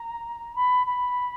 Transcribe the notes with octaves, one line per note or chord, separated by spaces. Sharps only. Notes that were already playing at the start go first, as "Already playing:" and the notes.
Already playing: A#5
B5
B5